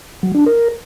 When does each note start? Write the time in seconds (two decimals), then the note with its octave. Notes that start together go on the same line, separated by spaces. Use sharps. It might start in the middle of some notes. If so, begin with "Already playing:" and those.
0.23 F#3
0.35 D4
0.46 A#4